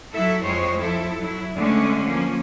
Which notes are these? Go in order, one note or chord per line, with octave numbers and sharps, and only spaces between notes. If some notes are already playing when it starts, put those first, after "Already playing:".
F#3 E4 A4 E5
F2 G#3 C5 C#5
F3 E4 A4
F#3 E4
D3 G#3 A3 C4 C#4
F3 A#3 C#4